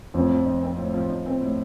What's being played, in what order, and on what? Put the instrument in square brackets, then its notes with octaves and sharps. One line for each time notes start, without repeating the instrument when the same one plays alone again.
[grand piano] F2 [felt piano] A2
[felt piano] F3
D#4
C4
A2
F3
D#4
C4
A2